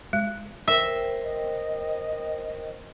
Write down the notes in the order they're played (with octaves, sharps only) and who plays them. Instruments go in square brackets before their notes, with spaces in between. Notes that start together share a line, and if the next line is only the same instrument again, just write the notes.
[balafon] G#3
[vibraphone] A#4 C5 G5 [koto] E5
[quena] D#5